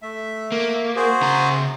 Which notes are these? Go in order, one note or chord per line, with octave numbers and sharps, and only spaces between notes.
A3 E5
A#3
F#4 G#4 C5
C#3 A#5